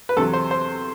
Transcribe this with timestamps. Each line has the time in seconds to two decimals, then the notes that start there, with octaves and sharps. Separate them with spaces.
0.09 B4
0.17 E2 C3 F#3 A4
0.34 C5
0.51 C5